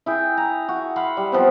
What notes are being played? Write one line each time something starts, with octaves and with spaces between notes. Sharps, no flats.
E4 G#4 G5
A#5
F#4
F5 F#5 B5 C6
G3
F3 B3 C4